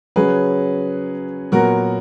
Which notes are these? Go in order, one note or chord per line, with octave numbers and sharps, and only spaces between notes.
C#3 F#3 C#4 G#4 B4
A#2 F#3 B3 F#4 A#4